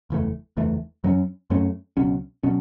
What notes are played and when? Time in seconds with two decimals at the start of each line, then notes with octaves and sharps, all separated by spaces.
0.10 F#1 E2 E3 A3
0.57 F#1 E2 E3 A3
1.04 F#2 F#3 A3 C#4
1.50 F#2 F#3 A3 C#4
1.97 C#2 B2 F#3 C#4
2.43 B2 F#3 C#4